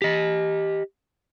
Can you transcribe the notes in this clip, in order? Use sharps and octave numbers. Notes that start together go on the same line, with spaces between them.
G4 D#5